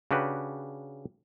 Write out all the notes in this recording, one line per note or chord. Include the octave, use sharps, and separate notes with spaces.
C#3 D4 F#4 G4 B4